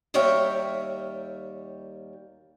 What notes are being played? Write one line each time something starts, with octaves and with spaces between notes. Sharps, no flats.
D#2 G3 A#4 C#5 E5 G5